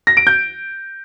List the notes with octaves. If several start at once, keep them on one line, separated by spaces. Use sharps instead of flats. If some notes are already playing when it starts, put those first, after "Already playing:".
A#6
D7
G6